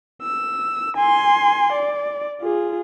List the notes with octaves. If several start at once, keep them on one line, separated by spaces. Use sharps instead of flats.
E6
G#5 C6
D5
F4 G#4